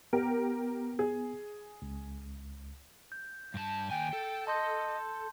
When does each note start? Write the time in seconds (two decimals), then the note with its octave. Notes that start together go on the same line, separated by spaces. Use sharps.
0.13 B3 G4 A#4
0.99 G#4
1.82 C#2
3.12 G6
3.54 G2 A5
3.90 D#2 G5 G#5
4.13 A4
4.47 D#5 A5 C6 G6